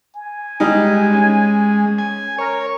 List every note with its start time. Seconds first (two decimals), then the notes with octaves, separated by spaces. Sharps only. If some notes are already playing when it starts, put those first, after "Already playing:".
0.16 G#5
0.60 G3 G#3 D#4
1.13 C#4
1.98 G#5
2.38 A#4 C#5